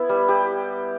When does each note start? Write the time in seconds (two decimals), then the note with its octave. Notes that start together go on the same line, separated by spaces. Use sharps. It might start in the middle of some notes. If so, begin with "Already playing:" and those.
Already playing: B3 E4
0.09 G3
0.29 G4